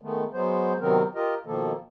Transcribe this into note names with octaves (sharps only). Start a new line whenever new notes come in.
D#3 G#3 A3 B3
F#3 G#3 B3 C5
C3 D#3 F#3 B3 C4 A#4
F4 G4 A#4 D#5
B2 D#3 F3 A#3 A4